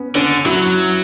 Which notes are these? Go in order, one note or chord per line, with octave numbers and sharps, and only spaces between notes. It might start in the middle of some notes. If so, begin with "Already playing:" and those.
Already playing: B3 C#4
D3 C#4
F#3 E4